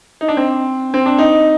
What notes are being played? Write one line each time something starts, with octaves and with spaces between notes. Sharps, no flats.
D#4
D4
C4
C4
D4
D#4